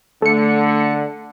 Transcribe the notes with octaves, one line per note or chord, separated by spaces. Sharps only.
D3 A3 C#7